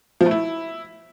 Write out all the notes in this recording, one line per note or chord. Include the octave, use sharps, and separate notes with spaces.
F3
A3
E4